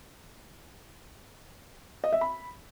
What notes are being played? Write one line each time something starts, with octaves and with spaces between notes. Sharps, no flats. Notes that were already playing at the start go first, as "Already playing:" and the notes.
D#5
E5
B5